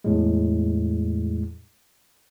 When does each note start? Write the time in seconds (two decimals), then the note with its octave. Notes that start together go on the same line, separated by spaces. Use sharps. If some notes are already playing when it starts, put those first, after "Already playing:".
0.04 E2 A2 G#3